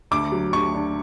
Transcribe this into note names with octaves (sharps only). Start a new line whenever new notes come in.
D2 D6
F#3
D2 C#6
D3